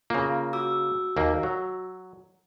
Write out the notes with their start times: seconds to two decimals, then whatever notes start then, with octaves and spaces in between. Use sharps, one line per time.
0.10 C#3 A#3 F4
0.53 F#4 D6 E6
1.17 D#2 A#3
1.43 F#3